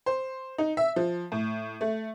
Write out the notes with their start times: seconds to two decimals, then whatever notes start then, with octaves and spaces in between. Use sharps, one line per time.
0.06 C5
0.58 D#4
0.77 E5
0.96 F3
1.32 A2
1.81 A3